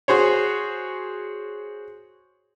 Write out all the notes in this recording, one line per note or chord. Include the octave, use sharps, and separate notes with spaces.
F#4 G#4 C5 C#5